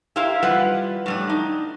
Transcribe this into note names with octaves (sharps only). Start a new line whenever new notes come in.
E4 G4 A#4 C5 F5
G3 F4 B4 F#5
A2 G3 D4
D#4